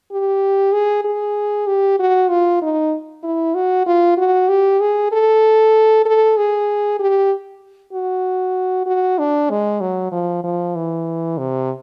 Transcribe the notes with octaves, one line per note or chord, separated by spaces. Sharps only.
G4
G#4
G#4
G4
F#4
F4
D#4
E4
F#4
F4
F#4
G4
G#4
A4
A4
G#4
G4
F#4
F#4
D4
G#3
F#3
F3
F3
E3
C3